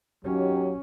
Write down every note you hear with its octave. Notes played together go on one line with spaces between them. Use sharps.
D#2 F#3 C#4 G4